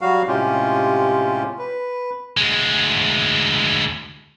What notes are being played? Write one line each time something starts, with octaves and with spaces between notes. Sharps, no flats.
F#3 G3 F#4 F5
A2 C3 G#3 C#4 F4 G4
B4
D2 G#3